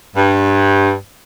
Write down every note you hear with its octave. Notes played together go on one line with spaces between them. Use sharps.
G2